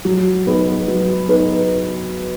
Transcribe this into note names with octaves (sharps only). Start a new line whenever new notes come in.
F#3
B3 D#4 G#4 B4
F#3
B3 D#4 G#4 B4